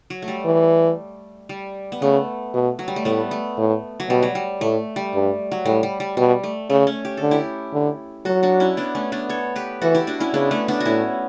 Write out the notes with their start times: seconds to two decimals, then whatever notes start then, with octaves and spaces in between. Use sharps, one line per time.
0.10 F#3
0.22 A3
0.28 G3
0.45 E3
1.49 G3
1.92 B3
2.02 C#3 A3
2.53 B2
2.79 F#3
2.88 G3
2.96 A3
3.05 A2 G3 B3
3.31 A3
3.58 A2
4.00 F#3
4.09 B2 G3
4.23 F#3
4.35 G3
4.61 A2 A3
4.96 G3
5.14 G2
5.52 F#3
5.65 A2 G3
5.83 G3
6.00 G3
6.17 B2 G3
6.44 A3
6.70 C#3 A3
6.87 A3 C#4
7.05 G4
7.17 D3 A4
7.31 E4 G4
7.73 D3
8.25 F#3 F#4 A4
8.43 D4 F#4
8.60 C#4 E4
8.77 B3 D4
8.95 A3 C#4
9.12 B3 D4
9.30 A4 C#5
9.56 G4 B4
9.82 E3 F#4 A4
9.95 E4 G4
10.07 D4 F#4
10.20 C#4 E4
10.33 C#3 B3 D4
10.51 A3 C#4
10.68 B3 D4
10.80 F#4
10.86 A2 C#4 E4